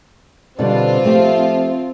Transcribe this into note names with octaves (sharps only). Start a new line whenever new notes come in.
B2 D3 G3 C4 D4 F4
F3 A3 G4